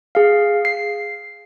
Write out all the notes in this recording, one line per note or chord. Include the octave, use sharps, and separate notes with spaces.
G#4 F5
C7